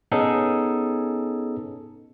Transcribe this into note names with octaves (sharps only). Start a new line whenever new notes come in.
B3 C#4 D#4 G#4 A4